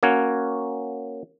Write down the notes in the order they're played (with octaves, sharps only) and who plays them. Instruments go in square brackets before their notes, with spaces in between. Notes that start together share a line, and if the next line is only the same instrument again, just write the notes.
[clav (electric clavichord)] A#3 C#4 F#4 C#5